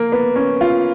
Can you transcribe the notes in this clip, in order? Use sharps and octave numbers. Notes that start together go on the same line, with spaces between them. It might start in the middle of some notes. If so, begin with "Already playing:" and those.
Already playing: A#3
B3
C#4
F4